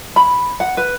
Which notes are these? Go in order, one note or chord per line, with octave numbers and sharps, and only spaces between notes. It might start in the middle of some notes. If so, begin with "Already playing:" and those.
B5
F#5
B4